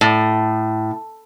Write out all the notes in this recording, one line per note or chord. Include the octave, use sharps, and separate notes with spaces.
A2